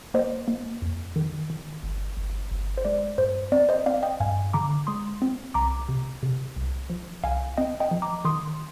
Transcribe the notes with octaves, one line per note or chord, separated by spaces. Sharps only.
A#3 C5 D#5
A#3
F2
D#3
D#3
G1
G1
G1
C5
G#3 D5
G2 C5
C4 D5
C5 D#5
C4 D5 F5
D#5 G5
G2 F5 G#5
D3 A#5 D6
G#3 C6 D#6
C4
C2 A#5 D6
C3
C3
C2
F3
C2 F5 G#5
C4 D#5 G5
D#5 G5
F3
A#5 D6
D#3 C6 D#6